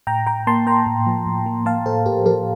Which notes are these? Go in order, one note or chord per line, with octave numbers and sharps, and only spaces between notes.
A2 G5 A#5
A2 G5 A#5
A#3 A5 C6
A#3 G5 A#5
A2
F3
A2
A#3
A#3 F5 A5
A2 A4 C5
A2 G4 A#4
F3 G4 A#4